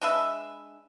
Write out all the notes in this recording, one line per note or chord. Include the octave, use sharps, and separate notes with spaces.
G#3 D4 B4 E5